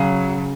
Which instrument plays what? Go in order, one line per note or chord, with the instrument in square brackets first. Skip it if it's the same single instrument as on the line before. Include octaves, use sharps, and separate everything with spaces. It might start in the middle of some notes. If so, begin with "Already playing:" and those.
Already playing: [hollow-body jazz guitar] C#3 [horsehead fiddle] F#3